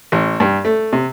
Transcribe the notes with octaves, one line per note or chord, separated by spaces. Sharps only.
A1
G2
A3
C3